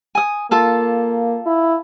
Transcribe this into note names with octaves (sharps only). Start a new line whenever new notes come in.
G#5 D#6
A#3 F4 A4 F5
E4